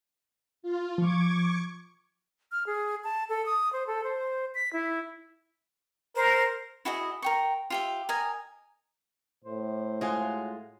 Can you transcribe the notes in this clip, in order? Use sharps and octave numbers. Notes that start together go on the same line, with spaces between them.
F4
F3 C#6 D6 G#6
F6
G#4
A5
A4
D#6
C5
A4
C5
B6
E4
A#4 C5
E4 F#4 G#4 D#5
A#4 G5 C#6
F4 G4 E5
A#4 D#5 G#5
A2 C5
G#3 F4 F#4 G#5 C6